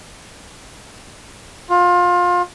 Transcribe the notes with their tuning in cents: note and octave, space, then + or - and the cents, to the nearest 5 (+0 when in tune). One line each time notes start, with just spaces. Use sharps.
F4 +25